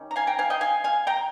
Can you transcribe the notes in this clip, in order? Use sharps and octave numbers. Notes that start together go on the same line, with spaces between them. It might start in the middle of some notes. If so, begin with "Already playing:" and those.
Already playing: D#3 G3 C#4
A#5
F5 G#5
G5 A#5
F5 G#5
D#5 G5
F5 G#5
F5 G#5
G5 A#5